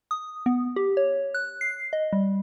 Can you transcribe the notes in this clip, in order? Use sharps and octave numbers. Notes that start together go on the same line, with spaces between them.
D#6
B3
G4
C#5
F#6
C7
D#5
G3